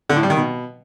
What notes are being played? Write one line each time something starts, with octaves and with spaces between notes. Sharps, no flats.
D3
A2
G3
D#3
B2